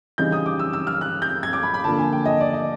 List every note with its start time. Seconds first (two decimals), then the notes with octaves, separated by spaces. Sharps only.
0.18 C#3 E3 G3 C4 D#4 G6
0.32 D#6
0.46 D6
0.59 E6
0.73 E6
0.87 F6
1.01 F#6
1.22 G6
1.43 G#6
1.53 D6
1.63 B5
1.74 B5
1.84 D3 F3 A#3 D4 A5
1.99 G#5
2.13 G5
2.26 D#5
2.40 D5
2.53 D#5